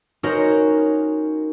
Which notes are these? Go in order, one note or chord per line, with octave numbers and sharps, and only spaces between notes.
C#4 D#4 F#4 A#4 C5